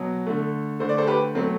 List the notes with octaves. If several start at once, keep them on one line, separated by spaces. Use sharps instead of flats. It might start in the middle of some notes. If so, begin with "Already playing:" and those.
Already playing: B2 F#3
D3 A3
D3 A3 C5
D5
A4 C5
G4 B4
B2 F#3 A3 C4